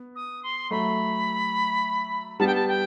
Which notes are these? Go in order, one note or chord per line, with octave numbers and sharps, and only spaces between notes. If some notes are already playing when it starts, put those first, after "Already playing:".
Already playing: B3
D#6
C6
F#3 A3 B5
G3 B3 A5
G5
A5
G5